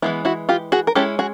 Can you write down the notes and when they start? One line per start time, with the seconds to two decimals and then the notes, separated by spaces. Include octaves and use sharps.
0.02 E3 G#3 B3 E4
0.25 E4 F#4
0.49 F4 G4
0.72 F#4 G#4
0.87 A#4
0.95 G#3 C#4 E4 G4 A4
1.19 F#4 G#4